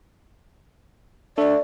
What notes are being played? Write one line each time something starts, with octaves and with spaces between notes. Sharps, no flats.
A3 D4 D5